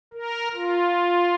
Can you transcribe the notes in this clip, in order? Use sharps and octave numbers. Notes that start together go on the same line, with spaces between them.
A#4
F4